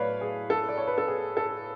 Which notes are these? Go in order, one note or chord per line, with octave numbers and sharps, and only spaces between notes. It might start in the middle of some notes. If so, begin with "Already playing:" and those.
Already playing: A2 F#3 A3 B4 C#5 D5 F5
G#4
A4
D5
C#5
B4
A4
G#4
A4